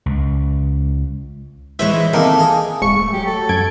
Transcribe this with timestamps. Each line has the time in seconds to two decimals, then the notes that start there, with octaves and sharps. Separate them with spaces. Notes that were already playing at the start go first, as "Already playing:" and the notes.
0.06 C#2
1.79 E3 G#3 E4 C5 C#5 E5 C#6
2.13 C3 D#3 A#3 C4 D#4 A4 A#4
2.39 G#4 F5
2.81 D#1 G#2 C#6 C#7
2.97 A3
3.13 F#3 G4
3.25 A4
3.49 F#2 G#6 D7